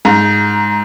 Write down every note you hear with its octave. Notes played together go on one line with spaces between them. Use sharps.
G#2 A#5